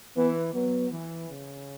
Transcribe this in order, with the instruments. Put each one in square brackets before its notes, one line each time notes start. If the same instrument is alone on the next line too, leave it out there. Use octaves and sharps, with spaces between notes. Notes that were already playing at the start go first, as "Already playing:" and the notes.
[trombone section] E3 [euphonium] B3
[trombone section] F#3 [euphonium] B3
[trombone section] E3
C#3